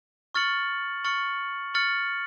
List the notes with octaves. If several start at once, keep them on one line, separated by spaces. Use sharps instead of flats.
C#6 F6 A6 C#7 F#7
C#6 F6 A6 C#7 F#7
C#6 F6 A6 C#7 F#7